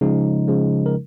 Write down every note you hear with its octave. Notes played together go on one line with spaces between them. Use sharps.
C#3 F3 G#3 D#4
C#3 F3 G#3
A#4